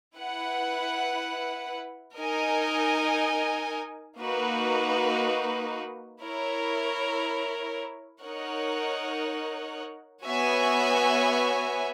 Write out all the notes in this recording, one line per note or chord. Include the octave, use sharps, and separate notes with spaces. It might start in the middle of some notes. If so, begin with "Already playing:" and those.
E4 B4 F#5
D#4 A#4 D#5 G#5
A#3 D#4 F#4 B4
E4 A#4 C#5
D#4 A#4 C#5 F#5
B3 F#4 C#5 E5 G#5